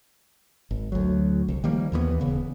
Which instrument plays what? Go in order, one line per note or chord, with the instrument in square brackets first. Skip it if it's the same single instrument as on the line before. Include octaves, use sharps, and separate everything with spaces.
[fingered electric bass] G#1
D2 F#3
C2
D#3 F3 G3 A#3
D#2 E3 G3 B3
D#1 C#3 B3